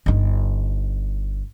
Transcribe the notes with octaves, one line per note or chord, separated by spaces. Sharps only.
G1 D#4